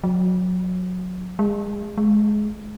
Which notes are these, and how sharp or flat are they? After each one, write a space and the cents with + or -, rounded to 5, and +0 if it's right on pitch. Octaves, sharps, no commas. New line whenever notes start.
F#3 -20
G#3 -25
G#3 +20